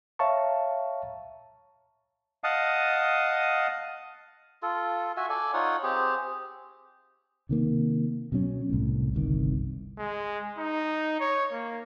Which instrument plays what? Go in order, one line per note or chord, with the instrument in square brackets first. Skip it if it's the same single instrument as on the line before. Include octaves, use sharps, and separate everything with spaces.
[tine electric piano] C#5 E5 F5 A5 A#5 C#6
[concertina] D#5 F5 F#5 A5 D#6
[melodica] F4 A4
F#4 E5 G#5
A4 D5 G#5
D#4 F4 C#5 F#5
C4 G4 G#4
[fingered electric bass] C3 D#3 A#3
B2 F#3 C#4
C2 A2
G1 C2 D#3
[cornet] G#3
D#4
C#5
A#3